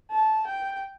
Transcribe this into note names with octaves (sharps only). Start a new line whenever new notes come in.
A5
G5